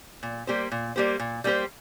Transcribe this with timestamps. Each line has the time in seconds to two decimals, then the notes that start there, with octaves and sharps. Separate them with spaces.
0.23 A#2
0.47 G3 A#3 G4 C5
0.72 A#2
0.96 G3 A#3 G4 C5
1.19 A#2
1.44 G3 A#3 G4 C5